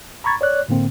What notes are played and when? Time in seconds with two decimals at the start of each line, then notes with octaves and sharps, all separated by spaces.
0.24 A#5 B5 C#6 G#6 A6
0.41 C#5 D5 F#6
0.68 A2 D3 A#3 C4